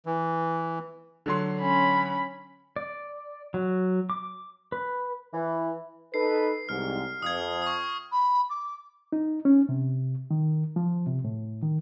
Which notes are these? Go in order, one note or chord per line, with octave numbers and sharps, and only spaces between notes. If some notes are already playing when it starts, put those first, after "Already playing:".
E3
D3 F#3 C6
C#4 B5
D5
F#3
D6
B4
E3
D#4 A4 B4 C7
C2 G#2 F6
F2 D#6 F6 G#6
C#6 D#6
B5
D6
D#4
C#4
C3
D#3
F3
C3
A2
D#3